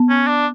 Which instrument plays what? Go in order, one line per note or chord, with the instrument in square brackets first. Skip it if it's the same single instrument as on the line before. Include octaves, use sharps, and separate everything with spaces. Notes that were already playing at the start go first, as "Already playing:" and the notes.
Already playing: [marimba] B3
[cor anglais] C#4
D4